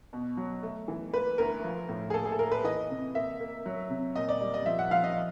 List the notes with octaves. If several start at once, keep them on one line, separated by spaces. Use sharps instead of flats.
B2
F#3
A3
E3
A#3 B4
D2 A#4
F3
A2
G#4
A#3 A4
G#4
A4
A#3 A#4
B4
E3 D#5
C3
A#3 E5
A#3
F#3
C3
A#2 D#5
D5
G3
D#5
F3 E5
F#5
F3 F5
D#5